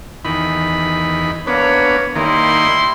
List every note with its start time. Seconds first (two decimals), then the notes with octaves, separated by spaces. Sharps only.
0.25 E2 D#3 B5
1.47 A#3 B3 D4 B4 C#5
2.16 D#3 G3 A#3 E4 C6